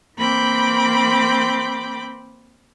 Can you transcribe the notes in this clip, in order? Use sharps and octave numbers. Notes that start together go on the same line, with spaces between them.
E3 A#3 C4 B5 D6 G6